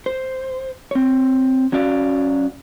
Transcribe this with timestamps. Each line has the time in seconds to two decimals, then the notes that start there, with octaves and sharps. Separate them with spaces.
0.06 C5
0.91 C4 C#5
1.72 F#3 C#4 F#4 D5 F5